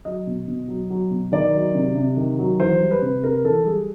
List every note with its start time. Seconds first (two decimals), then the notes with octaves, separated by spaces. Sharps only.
0.05 F#3 D#5
0.27 B2
0.48 B2
0.68 F#3
0.90 F#3
1.11 B2
1.32 D#3 D5
1.54 F#3
1.74 C3
1.95 C3
2.17 D#3
2.39 F#3
2.59 E3 C5
2.80 G3
2.91 B4
3.02 C3
3.23 C3 A#4
3.44 E3 A4
3.65 G3 G#4